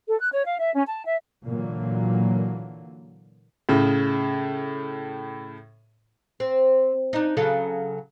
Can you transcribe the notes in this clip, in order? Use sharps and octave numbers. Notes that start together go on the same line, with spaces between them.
A4
F#6
C#5
F5
E5
C#4
A5
E5
A#2 D3 E3 F#3 A#3
A2 C#3
C4
D4 D#4
C#3 F#3 A4